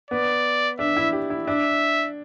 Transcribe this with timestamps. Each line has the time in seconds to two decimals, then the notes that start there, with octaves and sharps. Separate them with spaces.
0.10 B3 D5
0.79 D4 E5
0.97 E4
1.13 G4
1.30 E4
1.47 D4 E5